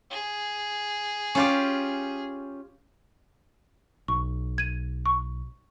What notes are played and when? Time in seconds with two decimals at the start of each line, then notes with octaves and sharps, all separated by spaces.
0.11 G#4
1.35 C#4 F4 G4
4.08 B1 C#6
4.58 G#6 D#7
5.06 C#6